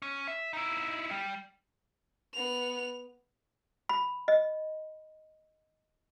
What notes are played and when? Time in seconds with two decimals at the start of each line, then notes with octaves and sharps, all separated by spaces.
0.02 C#4
0.28 E5
0.53 D#4 E4
1.11 G3
2.34 B3 F7
3.89 B5
4.28 D#5